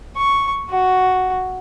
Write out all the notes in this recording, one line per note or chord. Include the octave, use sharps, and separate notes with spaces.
C#6
F#4